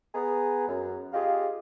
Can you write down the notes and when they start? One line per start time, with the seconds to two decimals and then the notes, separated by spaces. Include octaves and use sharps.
0.15 B3 G#4 A#5
0.68 F#2
1.13 F4 G4 G#4 D#5 F5